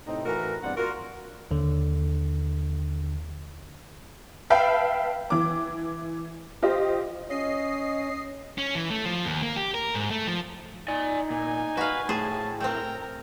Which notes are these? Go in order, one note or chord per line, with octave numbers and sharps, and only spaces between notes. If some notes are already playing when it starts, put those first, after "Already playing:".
A2 C3 C4 D#4
A2 E3 F#4 A#4
E2 G2 A#3 C4 D5 F#5
F4 F#4 A#4
D#2 D3
B4 E5 F5 G5 A5 B5
E3 D6
F4 G4 C5 D#5
C#4 D#5 C7
C#4
E3
A3
F3
D#2
A#3
G4
A#4
G#2
A3
F3
D#4 D5 G#5
A#2 G#5
F#4 B4 F5
A2 G#4 C5 A5
A3 C4 A#4 G5 A#5